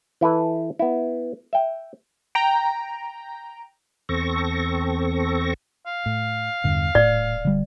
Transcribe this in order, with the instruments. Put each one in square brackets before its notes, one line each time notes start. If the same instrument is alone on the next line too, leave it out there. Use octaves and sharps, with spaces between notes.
[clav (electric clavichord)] E3 E4 A4 B4
B3 E4
E5 G5
[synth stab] G5 A#5
[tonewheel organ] E2 C4 A4 C#6 A#6
[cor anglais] F5
[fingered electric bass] A2
[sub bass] E2 [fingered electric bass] G2 D3
[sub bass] D#1 [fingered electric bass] A2 [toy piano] D5
[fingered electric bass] D3 G3